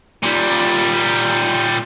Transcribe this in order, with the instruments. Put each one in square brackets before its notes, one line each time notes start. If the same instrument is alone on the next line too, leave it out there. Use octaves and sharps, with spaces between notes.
[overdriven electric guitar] A#2 G3